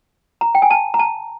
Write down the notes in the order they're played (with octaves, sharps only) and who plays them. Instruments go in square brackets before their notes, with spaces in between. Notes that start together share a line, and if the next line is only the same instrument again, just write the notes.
[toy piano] A#5
G5
G#5
A5
A#5
A5